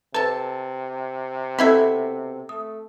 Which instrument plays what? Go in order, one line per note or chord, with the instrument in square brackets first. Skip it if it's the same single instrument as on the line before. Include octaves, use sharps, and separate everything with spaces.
[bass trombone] C3 [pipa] A4 A5 [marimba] B4
[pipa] B2 E4 E5 [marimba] C4 A4
[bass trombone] A3 [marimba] D#6